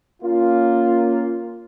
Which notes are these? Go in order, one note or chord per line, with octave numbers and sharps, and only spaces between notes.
A#3 C#4 F4